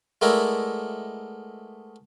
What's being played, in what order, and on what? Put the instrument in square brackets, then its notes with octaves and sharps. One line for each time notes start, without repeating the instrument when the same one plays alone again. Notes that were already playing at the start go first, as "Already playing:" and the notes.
[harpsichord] G#3 A3 B3 E4 A#4 D5